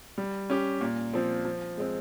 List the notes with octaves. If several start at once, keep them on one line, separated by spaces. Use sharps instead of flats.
G3
C#4 G4
A#2
F3 C4
F3
G#3 C4